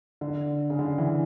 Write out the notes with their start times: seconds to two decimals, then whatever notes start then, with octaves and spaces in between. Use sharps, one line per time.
0.21 D3
0.70 C#3
0.79 D3
0.98 E3